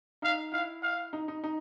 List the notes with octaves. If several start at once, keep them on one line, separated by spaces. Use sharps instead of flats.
D#4 F5
E4 F5
F5
D#4
D#4
D#4